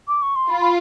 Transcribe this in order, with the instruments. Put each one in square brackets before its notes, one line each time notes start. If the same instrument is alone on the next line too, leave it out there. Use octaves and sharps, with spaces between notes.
[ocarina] D6
C#6
C6
[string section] F4 [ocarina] B5
[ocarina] B5